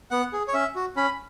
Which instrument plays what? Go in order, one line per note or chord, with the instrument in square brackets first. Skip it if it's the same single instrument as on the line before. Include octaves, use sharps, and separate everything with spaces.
[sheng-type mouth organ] B3 F#5
G#4
C#5
C#4 E5
F#4
C#4 B5